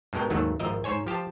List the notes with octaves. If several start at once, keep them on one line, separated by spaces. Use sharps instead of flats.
G2 B2 G#3 A#4 G5
D#2 G#2 D#3 F#3 A3
G#1 F3 A#4 D#5 E5
G#2 C5 C#5 G#5
F3 G4 C5 A5